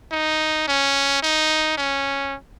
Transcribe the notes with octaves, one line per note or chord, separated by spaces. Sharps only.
D#4
C#4
D#4
C#4